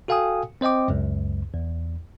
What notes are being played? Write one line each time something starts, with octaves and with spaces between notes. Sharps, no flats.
F#4 A4 F5 G5 G#5 D#6
C4 C5 D#5 G5 D6
C#2 F#2
E2